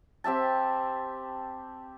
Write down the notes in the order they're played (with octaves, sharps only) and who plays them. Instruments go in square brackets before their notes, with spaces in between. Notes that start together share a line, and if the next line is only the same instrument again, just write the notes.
[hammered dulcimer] C4 G4 E5 A5